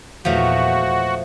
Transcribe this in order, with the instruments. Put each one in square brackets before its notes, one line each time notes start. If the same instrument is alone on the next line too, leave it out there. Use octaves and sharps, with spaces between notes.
[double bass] E2 A#2 [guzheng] F3 F#3 A3 [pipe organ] F#4